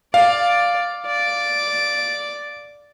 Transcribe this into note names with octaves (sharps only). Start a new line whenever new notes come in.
D5 F5
D5